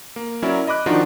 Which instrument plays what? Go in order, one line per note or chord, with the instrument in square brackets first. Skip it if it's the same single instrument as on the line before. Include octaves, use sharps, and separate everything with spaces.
[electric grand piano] A#3
F#3 C#4 E4 A#4 D5
D#5 B5 D6 F#6
D#3 F3 D4 D#4 F4 F#4